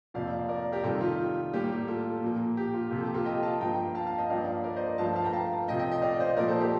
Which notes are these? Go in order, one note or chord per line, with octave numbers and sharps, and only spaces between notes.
F2 C3 F3 A#3 D5 F5
A#4 D5
G4 A#4
C3 D#3 G3 F4 A4
F4
A2 G3 A#3 G4
F4 A4
A#2 F3 A#3
G4
F4
C3 F3 A#3 G4
A4
G4
F4 A4
D#5 G5
F5 A5
G2 F3 A#3 G5 A#5
F5 A5
F5 A5
D#5 G5
G2 F3 A#3 D5 F5
A#4 D5
C5 D#5
G2 F3 A3 F5 A5
F5 A5
G5 A#5
F5 A5
C3 F3 A3 D#5 G5
D#5 G5
D#5 G5
D5 F5
C5 D#5
A#2 F3 A3 A#4 D5
A4 C5
G4